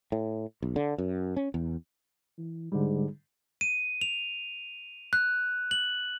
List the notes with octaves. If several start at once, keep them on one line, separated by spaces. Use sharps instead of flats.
A2
B1
D3
F#2
C#4
E2
E3
G#2 D3 G3
D#7
F7
F#6
F#7